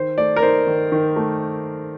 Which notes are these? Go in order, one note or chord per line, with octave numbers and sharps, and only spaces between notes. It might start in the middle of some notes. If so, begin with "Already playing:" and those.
Already playing: D#3 C5
A3 D5
A#4
D#4 C5
D#3
D#3
A3